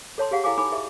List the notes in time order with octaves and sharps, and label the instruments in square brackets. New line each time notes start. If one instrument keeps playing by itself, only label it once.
[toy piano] A4 C#5 A5 C6
G4 G#4 F5 F#5
E4 A4 F5 G#5 D6
D#4 A4 G#5 B5 D6
G#4 D#5 E5